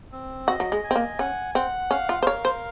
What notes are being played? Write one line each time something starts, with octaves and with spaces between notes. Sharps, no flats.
C4
F#4 D#5
F#3
G#3
G#5
C4
A#3
C#4 F#5
C4 F#5
C#4 F5
F4
C5
A#4 C#5
C5